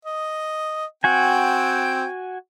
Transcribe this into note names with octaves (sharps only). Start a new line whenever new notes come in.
D#5
C4 F#4 G5 G#5